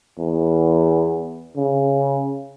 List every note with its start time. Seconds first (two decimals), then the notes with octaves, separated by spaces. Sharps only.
0.19 E2
1.57 C#3